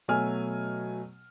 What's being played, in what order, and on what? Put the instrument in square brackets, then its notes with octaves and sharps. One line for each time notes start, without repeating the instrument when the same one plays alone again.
[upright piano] B2 F#3 A3 G#5 F6